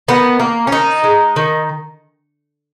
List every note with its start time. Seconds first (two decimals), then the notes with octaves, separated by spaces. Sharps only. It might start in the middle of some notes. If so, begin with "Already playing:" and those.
0.08 D#3 B3
0.40 A#3
0.67 C#4
0.72 D#3 D#4
1.04 G#3
1.36 D#3